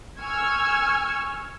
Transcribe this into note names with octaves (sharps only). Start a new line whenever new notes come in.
G#5 C#6 E6 F6 G6 G#6